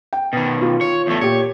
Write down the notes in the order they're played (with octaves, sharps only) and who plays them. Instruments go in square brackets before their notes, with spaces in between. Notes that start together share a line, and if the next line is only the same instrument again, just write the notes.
[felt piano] G5
[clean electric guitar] B2 D#3
[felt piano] F4
[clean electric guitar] C#5
E2 A3
[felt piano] A#2 G4 [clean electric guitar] C#5